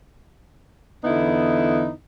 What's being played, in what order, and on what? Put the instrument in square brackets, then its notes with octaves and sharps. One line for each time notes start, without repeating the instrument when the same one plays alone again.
[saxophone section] E2 D3 B3 D#4 E4